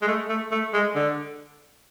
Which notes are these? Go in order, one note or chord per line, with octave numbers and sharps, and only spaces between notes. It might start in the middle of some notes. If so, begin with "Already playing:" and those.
G#3
A3
A3
A3
G#3
D3